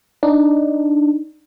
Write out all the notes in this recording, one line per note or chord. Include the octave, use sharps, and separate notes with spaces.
D4 D#4